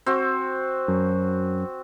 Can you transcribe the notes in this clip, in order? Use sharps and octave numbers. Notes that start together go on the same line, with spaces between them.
C4 F#4
F#2